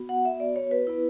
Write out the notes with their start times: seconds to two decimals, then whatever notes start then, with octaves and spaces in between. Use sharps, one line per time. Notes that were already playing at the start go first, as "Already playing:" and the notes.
Already playing: B3 F#4
0.09 F#5
0.25 E5
0.40 D5
0.56 C#5
0.71 B4
0.87 B3 E4